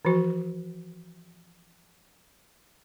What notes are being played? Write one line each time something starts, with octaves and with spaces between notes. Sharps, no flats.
E3 F3 F#4